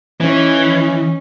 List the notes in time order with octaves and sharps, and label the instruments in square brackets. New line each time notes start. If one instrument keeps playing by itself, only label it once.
[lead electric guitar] E3 [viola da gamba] C#4 D#4